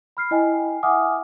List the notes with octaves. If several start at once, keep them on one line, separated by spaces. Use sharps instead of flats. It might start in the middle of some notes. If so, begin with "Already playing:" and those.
B5 F6 C7
E4 D#5 G5 G#5
E5 F#5 G#5 D6 D#6 F6